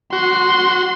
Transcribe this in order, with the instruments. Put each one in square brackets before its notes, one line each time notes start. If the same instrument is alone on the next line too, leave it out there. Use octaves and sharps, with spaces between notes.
[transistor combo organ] F#4 [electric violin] C6